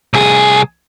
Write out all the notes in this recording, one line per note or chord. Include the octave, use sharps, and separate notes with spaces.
C2 G#4